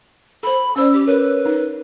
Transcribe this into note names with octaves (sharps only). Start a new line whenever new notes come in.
A4 C5 B5
C#4 C5 D5 E6
G4
A#4 B4 C#5
D#4